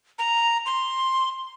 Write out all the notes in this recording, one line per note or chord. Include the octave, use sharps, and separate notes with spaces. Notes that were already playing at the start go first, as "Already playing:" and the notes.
A#5
C6